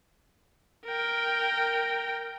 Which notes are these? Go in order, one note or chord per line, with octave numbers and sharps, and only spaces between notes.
A#4 G5